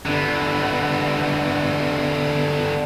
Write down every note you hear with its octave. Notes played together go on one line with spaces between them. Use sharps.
D3 B3